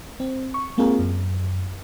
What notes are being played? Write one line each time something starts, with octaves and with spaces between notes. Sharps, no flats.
C4
C#6
G#3 A#3 C4 F4 G#4 A#4
F#2